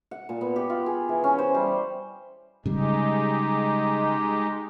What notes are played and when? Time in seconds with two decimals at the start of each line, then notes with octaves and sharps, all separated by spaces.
0.11 F#5
0.29 A#2
0.41 B3
0.56 G4
0.70 F4
0.86 G#4
1.09 E3
1.24 C#4
1.38 C5
1.55 G3
2.66 C#3 G3 G#3 D#4 G4